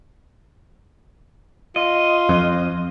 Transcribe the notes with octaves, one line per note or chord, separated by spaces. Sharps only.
F4 D#5
F2